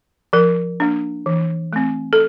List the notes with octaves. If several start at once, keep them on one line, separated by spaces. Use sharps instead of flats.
F3 A#4
A#3 D4
E3
A3 C4
A4